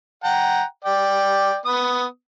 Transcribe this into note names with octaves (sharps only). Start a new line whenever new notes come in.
F#5 G5 A#5
D5 G5
B3 D#6